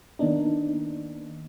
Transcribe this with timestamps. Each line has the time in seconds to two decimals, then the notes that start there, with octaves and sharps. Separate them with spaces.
0.19 D#3 A#3 B3 D4 D#4